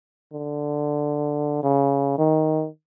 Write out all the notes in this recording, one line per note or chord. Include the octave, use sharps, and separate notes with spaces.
D3
C#3
D#3